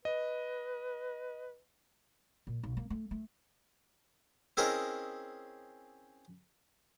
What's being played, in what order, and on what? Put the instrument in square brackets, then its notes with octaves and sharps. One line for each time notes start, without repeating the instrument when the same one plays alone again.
[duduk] B4 [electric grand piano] D#5
[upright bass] A#2
B1
A#3
A3
A3
[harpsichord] C4 C#4 E4 G#4 A#4 D#5